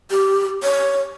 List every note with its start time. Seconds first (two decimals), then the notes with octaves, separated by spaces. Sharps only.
0.11 G4
0.63 C#5